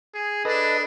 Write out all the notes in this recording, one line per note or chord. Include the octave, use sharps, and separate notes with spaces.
G#4
D4 A4 B4 D#5